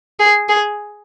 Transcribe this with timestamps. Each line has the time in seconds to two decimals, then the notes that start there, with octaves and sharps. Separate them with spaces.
0.19 G#4
0.49 G#4